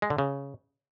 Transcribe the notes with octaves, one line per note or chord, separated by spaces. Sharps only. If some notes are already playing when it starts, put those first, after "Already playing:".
G#3
D3
C#3